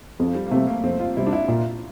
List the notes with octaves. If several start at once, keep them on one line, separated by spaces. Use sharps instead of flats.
F2
F3
G3
A#3
C3 G3 A3 C4
A#3
F2 C4
F4
C3 G3 C4 E4
D4
E4
A#2 F4